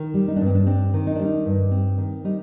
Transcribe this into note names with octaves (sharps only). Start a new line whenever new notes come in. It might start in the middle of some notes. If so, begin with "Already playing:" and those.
Already playing: D#3
G3
D#4
D4
G2
C4
D4
C4 D4
D#3
D#4
G3 D4
D#4
G2
C4
D#3
G3 D#4